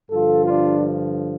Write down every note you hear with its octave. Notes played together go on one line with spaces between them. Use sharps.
G2 D3 F3 F4 A4
D4 F4